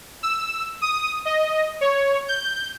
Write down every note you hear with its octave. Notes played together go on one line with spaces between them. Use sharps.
E6
D#6
D#5
C#5
G6